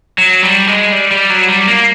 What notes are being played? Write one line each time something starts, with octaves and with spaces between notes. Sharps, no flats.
F#3
G3
G#3
G3
G3
F#3
G3
A#3